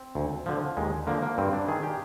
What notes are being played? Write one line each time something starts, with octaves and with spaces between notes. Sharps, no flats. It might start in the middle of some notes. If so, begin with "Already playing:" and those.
Already playing: C4
D2
D3 F3
D#2 G#3
D3 F3 A#3
A#3
G2 C4
D4
D#3 G#4
G4